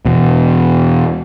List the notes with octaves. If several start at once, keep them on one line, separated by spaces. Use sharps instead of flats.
E2 B2